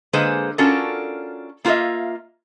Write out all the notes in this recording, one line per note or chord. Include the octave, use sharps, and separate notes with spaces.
D3 G#3 A#3 G#4 B4 C5
C#4 D4 F4 F#4 A4 A#4
A#3 F4 F#4 A#4 D#5 E5